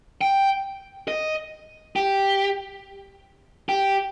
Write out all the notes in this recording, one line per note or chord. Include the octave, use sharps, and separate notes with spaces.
G5
D#5
G4
G4